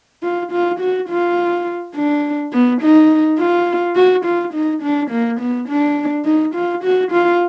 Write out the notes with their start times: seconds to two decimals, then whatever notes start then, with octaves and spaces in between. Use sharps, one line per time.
0.23 F4
0.52 F4
0.80 F#4
1.09 F4
1.95 D4
2.53 B3
2.81 D#4
3.39 F4
3.96 F#4
4.25 F4
4.54 D#4
4.82 D4
5.10 A#3
5.40 B3
5.69 D4
6.25 D#4
6.55 F4
6.84 F#4
7.11 F4